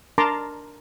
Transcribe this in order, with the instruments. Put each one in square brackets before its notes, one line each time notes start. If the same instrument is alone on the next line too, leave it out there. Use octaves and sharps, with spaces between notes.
[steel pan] D4 A#4 A5 A#5 C6 D6